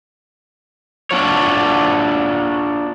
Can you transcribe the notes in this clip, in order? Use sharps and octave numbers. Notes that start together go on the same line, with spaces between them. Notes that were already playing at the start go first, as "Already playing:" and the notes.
D4 F4 F#4 C#5